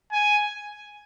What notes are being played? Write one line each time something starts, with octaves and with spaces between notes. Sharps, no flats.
G#5